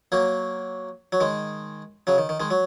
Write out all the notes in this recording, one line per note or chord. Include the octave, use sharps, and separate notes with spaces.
F#3 A#3
F#3
D#3 G#3
C#3 F#3
D#3
D#3
D#3 G#3
F#3